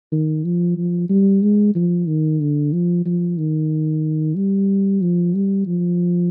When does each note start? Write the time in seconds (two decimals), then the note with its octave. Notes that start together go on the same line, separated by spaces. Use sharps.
0.12 D#3
0.44 F3
0.77 F3
1.09 G3
1.42 G#3
1.75 F3
2.07 D#3
2.40 D3
2.73 F3
3.05 F3
3.38 D#3
4.36 G3
5.02 F3
5.34 G3
5.67 F3